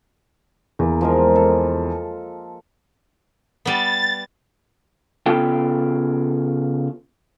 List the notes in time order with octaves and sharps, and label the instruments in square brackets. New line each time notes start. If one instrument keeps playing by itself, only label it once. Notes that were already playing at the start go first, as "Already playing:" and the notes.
[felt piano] E2 [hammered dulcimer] A#3
[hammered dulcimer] F3 G#3 A#4
A4
[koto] G3 B3 [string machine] A6
[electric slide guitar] C#3 B3 F4 A4 G5